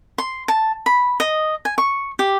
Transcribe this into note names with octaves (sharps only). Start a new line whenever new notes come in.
C6
A5
B5
D#5
G#5
C#6
G4